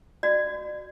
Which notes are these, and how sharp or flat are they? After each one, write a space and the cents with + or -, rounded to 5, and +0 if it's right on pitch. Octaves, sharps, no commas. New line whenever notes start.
F#4 +0 D5 +35